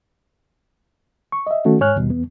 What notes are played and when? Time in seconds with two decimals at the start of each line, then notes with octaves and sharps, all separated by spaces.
1.32 C#6
1.47 D#5 E5
1.65 D#3 A3 C#4 F#4
1.81 G#2 C#5 G#5 F6 F#6
1.96 D#2 B2 G3
2.10 E2 B3